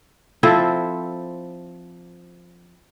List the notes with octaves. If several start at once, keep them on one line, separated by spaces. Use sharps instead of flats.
F3 C4 E4 A4